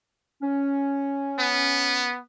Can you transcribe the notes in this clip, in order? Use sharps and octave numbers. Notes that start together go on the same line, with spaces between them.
C#4
B3